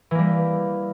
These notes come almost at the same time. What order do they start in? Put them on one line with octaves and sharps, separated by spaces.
E3 A#3 G3